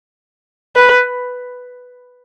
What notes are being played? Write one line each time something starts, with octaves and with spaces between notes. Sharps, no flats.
B4